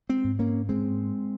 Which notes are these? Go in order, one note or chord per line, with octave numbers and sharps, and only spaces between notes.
G#3 C4
G#2
A#3 C#4
G#2 G#3 C4